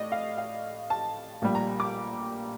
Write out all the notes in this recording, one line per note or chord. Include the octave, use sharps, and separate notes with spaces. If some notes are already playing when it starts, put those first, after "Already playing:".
Already playing: A2 D5 D#5
F5
F5
A5
A#1 A#2 G3
A#5
D6